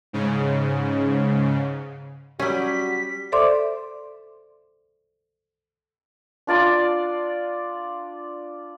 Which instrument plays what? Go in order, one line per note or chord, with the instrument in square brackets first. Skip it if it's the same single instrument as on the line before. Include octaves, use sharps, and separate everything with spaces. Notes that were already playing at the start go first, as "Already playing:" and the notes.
[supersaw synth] G#2 C#3
[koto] F#3 C#4 [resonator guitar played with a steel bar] G3 [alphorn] F#4 [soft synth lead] B6
[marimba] A4 C5 D5 E5 C6 D6
[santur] D4 F4 D5 C6